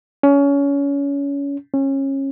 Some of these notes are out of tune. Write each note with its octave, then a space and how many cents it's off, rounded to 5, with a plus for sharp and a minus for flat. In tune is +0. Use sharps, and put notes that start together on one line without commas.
C#4 +25
C#4 -25